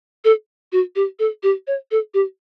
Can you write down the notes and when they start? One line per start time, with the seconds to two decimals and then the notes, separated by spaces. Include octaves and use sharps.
0.25 A4
0.72 F#4
0.96 G4
1.19 A4
1.43 G4
1.67 C#5
1.91 A4
2.14 G4